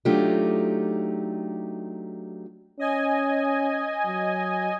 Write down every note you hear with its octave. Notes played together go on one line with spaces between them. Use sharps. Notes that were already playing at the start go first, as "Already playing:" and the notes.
F#3 A3 D4 D#4 F4 G4
C#4 D#5 G#5
F#3